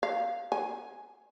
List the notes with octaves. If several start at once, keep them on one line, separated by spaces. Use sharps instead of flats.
F5
G#5